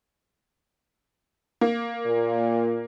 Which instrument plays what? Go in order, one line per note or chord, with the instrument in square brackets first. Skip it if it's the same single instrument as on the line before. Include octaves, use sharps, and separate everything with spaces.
[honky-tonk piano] A#3
[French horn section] A#2